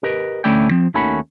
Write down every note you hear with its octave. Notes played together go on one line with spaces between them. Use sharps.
G4 A#4 B4 D#5
D2 A3 C#4 E4 D5 G5
F3 C4
D#2 D#3 A3 C#4 F#4 B5